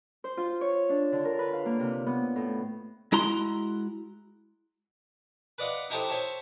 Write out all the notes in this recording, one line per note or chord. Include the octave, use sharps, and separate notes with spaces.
C5
F4
C#5
D4
D3
A#4
B4
F5
A#3
C3
B3
A2
G#3 E4 F#4 A#5 C6
B4 D5 D#5 F5 F#5 C6
D#4 E4 G4 A4 C5 D#5
C5 C#5 E5 A5 C#6